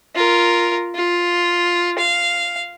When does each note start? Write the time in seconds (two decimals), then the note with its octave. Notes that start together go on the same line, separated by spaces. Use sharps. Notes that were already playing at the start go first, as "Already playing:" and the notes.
0.15 F4 A#4
0.95 F4
1.99 F5